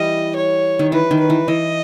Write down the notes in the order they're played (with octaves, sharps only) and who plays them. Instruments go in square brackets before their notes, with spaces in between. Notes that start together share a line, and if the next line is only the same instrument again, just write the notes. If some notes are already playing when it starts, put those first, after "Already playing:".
Already playing: [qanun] E3 G3 [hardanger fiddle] D#5
[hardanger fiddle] C#5
[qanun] D#3
[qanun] E3 [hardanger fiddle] B4
[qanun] D#3
[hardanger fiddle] B4
[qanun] E3
[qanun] E3 [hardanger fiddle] D#5